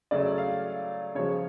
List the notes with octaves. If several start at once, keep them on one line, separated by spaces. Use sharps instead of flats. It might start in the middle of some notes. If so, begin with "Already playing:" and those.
C#3 F#3 A3 D5
F5
C#3 F3 G#3 C#5